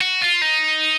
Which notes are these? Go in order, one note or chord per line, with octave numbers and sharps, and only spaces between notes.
F#4
F4
D#4